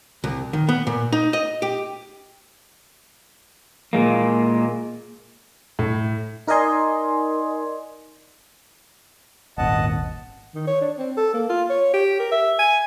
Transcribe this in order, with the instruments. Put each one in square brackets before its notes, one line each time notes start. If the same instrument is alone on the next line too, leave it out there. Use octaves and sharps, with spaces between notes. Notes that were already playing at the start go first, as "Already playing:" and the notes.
[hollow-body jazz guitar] C2
D#3
B3
A#2
D#4
D#5
G4
[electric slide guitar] A#2 G#3 A#3
[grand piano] A2
[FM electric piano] D#4 A#4 D5 D#5 G#5 C6
[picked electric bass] D#1 G#1 [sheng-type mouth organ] D#5 F#5 A5
[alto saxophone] D#3
C#5
D4
C4
A4
A#3
F4
C#5
G4
A#4
E5
G#5